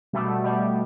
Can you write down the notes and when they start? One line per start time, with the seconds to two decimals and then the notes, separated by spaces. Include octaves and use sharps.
0.13 B2 G3 A3
0.44 B2 G3